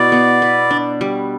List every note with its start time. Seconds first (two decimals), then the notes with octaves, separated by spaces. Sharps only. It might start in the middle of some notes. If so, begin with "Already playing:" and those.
Already playing: B2 E4 D5
0.12 B3
0.42 B4
0.71 D4
1.01 G3